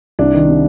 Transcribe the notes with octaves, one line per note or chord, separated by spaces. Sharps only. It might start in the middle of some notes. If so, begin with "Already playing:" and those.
C2 D4
D#3
C3